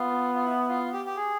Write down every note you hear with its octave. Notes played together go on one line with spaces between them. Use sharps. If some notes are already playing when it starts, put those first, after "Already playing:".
Already playing: B3 F4
F4
E4
F4
G4
G4
G#4